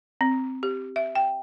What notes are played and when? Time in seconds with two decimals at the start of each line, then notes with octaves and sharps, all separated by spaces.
0.21 C4
0.63 G4
0.96 E5
1.15 G5